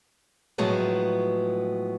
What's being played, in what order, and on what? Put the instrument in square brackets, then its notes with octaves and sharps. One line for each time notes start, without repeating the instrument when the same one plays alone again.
[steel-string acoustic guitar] A2 F3 F#3 G#3 B3